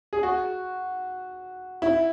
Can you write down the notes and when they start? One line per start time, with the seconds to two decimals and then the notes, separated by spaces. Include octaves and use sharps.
0.13 G#4
0.23 F#4
1.82 E4